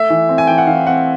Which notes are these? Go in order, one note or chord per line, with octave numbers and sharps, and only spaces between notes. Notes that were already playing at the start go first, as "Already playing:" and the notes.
Already playing: A3 E5
E3
C4
G#5
E3 G5
F#5
E3 F5
C4 F#5